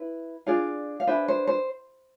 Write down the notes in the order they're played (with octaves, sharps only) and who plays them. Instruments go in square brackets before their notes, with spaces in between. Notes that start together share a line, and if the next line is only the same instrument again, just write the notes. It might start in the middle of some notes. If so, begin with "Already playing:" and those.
Already playing: [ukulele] E4 B4
D4 F4 G#4 D5 F5
F5
D4 G#4 B4 C5 E5
C5
C5